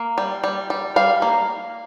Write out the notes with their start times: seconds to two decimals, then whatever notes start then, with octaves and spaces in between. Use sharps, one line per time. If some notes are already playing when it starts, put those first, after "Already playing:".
Already playing: A#3
0.18 G3
0.44 G3
0.70 G3
0.96 G3 F5
1.22 A#3